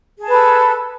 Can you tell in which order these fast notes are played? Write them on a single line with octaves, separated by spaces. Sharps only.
G#4 A5 B4 A4